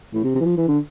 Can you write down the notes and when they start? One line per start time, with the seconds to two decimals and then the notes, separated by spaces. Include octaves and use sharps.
0.13 A2
0.24 C3
0.35 C3
0.40 E3
0.45 F3
0.57 E3
0.68 D3